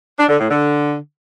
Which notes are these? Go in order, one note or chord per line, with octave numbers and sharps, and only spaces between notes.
D4
D3
A2
D3